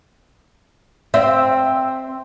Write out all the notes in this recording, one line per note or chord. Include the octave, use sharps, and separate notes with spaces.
C4 E5